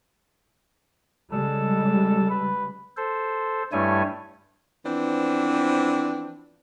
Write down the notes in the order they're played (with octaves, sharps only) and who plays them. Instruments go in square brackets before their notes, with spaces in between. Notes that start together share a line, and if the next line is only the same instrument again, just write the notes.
[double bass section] C#3 G3 G#3 [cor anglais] A4
[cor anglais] B4
[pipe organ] A4 C5
G2 G3 A3 E4 C#5 G#5
[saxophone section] E3 F3 B3 C4 D4